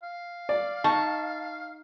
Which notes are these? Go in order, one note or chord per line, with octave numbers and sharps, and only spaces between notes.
F5
D5
D#4 A5 C#6